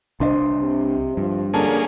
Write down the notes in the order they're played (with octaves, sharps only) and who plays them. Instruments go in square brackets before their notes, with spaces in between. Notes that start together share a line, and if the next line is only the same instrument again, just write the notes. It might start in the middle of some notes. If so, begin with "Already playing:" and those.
[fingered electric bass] C2 D4 [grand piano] C5 D#5 C6
[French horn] C3
[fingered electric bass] G2 [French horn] F3
[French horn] D3 [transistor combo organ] A#3 C#4 G#4 [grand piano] A5